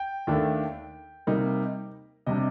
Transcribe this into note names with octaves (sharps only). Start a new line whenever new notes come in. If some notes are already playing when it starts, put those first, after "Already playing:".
Already playing: G5
D#2 D#3 A3 D4
C3 G3 A#3 D#4
C3 G3 D4 D#5